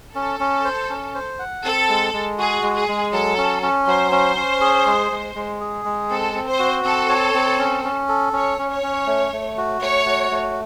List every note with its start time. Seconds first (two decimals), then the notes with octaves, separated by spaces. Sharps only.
0.15 C#4 A4
0.40 C#4
0.65 C5
0.90 C#4
1.15 C5
1.39 F#5
1.64 C4 A4
1.89 G#3
2.13 G#3
2.38 F#4 G#4
2.63 G#3
2.75 G#4
2.88 G#3
3.12 F#3 A4
3.37 C#4
3.63 C#4
3.87 F#3 C5
4.12 C#4
4.36 C#4
4.61 G#4
4.86 G#3
5.11 G#3
5.35 G#3
5.60 G#4
5.85 G#3
6.10 C4 A4
6.35 C4
6.47 C5
6.59 F#4
6.84 C4 A4
7.09 C#5
7.34 C4
7.59 C#4
7.84 C#4
8.09 A4
8.33 C#4 C#5
8.58 C#4
8.70 C#5
8.83 C#4
9.07 A3
9.32 A3
9.57 F#4
9.81 A3 C#5
10.06 F#4
10.31 A3